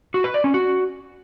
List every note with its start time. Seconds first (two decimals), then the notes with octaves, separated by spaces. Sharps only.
0.14 F#4
0.24 B4
0.34 D5
0.44 C#4
0.54 F#4